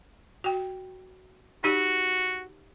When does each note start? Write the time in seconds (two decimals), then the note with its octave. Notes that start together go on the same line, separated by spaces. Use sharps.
0.44 F#4 G5
1.64 D#4 F#4 G4